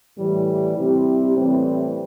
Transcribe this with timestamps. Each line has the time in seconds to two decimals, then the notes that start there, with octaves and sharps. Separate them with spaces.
0.18 A2 E3 G3
0.77 C3 G3 C4 E4 G4
1.36 A2 E3 G3 C4